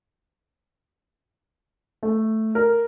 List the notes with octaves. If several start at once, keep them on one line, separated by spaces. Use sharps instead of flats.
A3
A#4